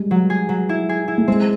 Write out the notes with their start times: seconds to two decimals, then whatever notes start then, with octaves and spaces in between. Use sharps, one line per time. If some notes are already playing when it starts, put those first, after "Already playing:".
Already playing: G3 G#3
0.11 F#3
0.30 G#4
0.49 F#3
0.69 E4
0.89 G#4
1.08 E4
1.18 A3
1.28 G#3 C4